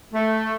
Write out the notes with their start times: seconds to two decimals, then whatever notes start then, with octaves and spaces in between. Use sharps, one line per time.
0.14 A3